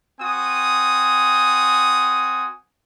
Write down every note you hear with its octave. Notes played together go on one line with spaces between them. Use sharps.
C4 F#4 G#5 D#6